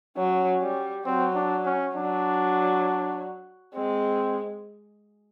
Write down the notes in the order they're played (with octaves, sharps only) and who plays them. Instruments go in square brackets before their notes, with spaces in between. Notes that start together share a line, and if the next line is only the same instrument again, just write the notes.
[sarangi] F#3 [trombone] C#4
[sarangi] G3
[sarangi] F#3 [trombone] C4
[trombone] D4
C#4
[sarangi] F#3 [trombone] D4
[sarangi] G#3 [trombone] C4